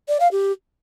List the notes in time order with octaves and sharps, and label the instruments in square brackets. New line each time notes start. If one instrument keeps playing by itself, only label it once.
[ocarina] D5
F5
G4